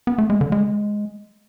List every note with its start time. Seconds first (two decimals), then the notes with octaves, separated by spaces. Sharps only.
0.07 B3
0.18 A3
0.30 G#3
0.41 D3
0.52 G#3